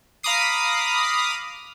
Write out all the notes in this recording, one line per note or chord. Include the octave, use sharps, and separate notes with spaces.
F5 A#5 B5 D6 D#6 C7